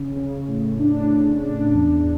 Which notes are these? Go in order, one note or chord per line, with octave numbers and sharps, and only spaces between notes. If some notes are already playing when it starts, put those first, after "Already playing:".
Already playing: C#3
C#3
A2
D4
C#3
D4
E2